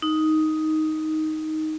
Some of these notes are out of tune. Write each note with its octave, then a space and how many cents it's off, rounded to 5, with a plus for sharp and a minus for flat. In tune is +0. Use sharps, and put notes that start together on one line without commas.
D#4 +5